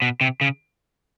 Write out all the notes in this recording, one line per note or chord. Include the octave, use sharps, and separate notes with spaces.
B2
C3
C#3